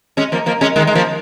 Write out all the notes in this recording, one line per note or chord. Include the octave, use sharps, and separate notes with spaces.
G#3 C#4
F3 A#3
F3 A#3
G#3 C#4
D#3 G#3
G#3
F3 A#3